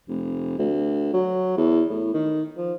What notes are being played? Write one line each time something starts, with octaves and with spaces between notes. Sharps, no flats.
F1
D2
F#3
E2
A2
D#3
F3